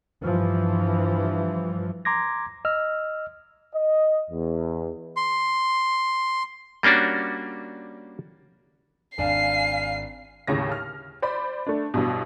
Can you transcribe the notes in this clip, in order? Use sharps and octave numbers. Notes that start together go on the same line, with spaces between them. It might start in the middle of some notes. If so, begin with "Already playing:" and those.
G2 E3 F3
A#5 C6 D6 G#6 A#6
D#5 E6 F6
D#5
E2
C6
G3 A#3 C#4 D4 F#4
G#1 D4 F5 G#5 C7
D#2 A2 C#3 C#5 A#6
F6
C5 D5 B5
A3 D4
A1 G2 B2